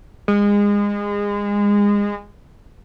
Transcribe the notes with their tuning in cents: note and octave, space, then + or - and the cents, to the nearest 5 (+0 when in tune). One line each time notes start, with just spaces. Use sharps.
G#3 -25